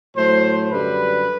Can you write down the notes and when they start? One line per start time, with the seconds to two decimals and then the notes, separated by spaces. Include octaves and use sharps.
0.16 A2 F#3 A3 C5
0.70 F#2 D3 G3 B4